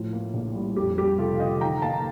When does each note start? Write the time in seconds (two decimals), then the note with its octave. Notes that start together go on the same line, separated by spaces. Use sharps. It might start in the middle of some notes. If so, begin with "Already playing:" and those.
Already playing: A2 F3
0.13 A#3
0.34 A#1
0.55 G3
0.76 F2 G4
0.98 G3 G4
1.18 F1 F4 A4
1.35 F5
1.40 D3 D#5 G5
1.61 D#3 G5 A#5
1.82 A#3 F5 A5